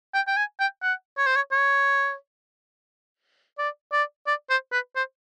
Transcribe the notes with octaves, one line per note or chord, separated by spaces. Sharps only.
G5
G5
G#5
G5
F#5
C#5
C5
C#5
C#5
D5
D5
D5
C5
B4
C5